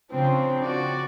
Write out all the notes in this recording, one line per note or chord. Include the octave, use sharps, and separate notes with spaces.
C#3 F3 C4 D4
F#4 D5